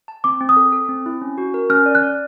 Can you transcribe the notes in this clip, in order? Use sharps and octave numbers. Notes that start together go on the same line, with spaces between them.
A5
C4 D6
C4
D#6
A4
A4
C4
E4
C#4
F#4
A#4
C#4 F6
D5
F#6
D5